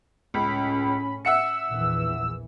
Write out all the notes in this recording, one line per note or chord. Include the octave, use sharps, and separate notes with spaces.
C#2 A2 C#4 B5
E5 F#5 E6 C#7
A#1 E2 E3